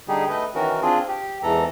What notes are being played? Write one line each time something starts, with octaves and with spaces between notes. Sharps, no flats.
D3 G3 D#4 G4 G#4
A3 B4 D#5
D#3 E3 C#4 F#4 A#4
C4 D4 F4 G#4
G4
E2 G#2 E3 A4 A#5